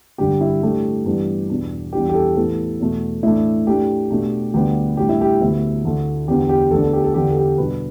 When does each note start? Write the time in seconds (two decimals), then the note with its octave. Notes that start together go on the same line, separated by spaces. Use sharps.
0.18 G2 D3 G3 D4 G4
0.41 E4
0.62 A2 A3 D4 G4
1.06 G2 E3 B3 D4
1.50 E2 B2 B3 D4
1.93 E2 E3 G3 D4 G4
2.09 G4
2.15 A4
2.36 A2 E3 B3 A4
2.80 E2 B2 A3
3.23 A2 E3 A3 D4 E4
3.67 A2 A3 D4 G4
4.10 B2 A3 D4
4.54 D2 D3 G3 B3 D4 G4
4.97 A2 G3 D4 G4
5.09 E4
5.21 G4
5.41 D2 D3 B3 E4
5.84 D2 D3 A3 D4
6.28 E2 D3 B3 D4 G4
6.49 G4
6.71 D2 D3 B3 D4 A4
6.82 A4
6.93 G4
7.04 A4
7.14 E2 D3 B3 D4 G4
7.31 A4
7.37 G4
7.58 B2 G3 D4 B4